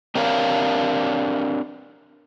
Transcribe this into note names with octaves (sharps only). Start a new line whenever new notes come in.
C4 D4 G4 A#4 C#5 F5